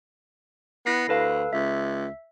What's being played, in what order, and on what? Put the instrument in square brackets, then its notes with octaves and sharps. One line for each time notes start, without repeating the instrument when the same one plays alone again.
[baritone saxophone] B3 [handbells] E4 A#6 C7
[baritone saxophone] D2 [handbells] A4 B4 F5
[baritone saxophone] C#2 [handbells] E5